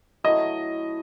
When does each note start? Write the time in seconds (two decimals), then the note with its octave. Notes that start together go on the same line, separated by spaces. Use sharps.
0.24 F#3 A3 E4 D#5